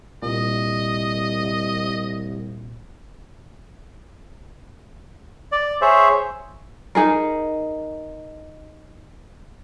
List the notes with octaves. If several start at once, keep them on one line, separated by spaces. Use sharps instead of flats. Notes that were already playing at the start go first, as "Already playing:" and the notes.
C2 A#2 D#5
D5
G#4 C5 C#5 E5
D#4 G#4 A#4